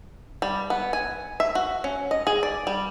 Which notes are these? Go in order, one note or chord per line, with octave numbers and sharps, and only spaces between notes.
G3
B3
G#5
E5
F#4
C#4
D#5
G#4
D5
G3